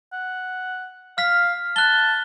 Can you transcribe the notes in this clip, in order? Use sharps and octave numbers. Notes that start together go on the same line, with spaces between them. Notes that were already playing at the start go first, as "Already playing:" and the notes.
F#5
F5 F6 B6
A5 F#6 G7